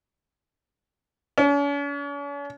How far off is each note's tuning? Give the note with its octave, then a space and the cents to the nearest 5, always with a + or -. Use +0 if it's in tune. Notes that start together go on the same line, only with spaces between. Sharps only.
C#4 +45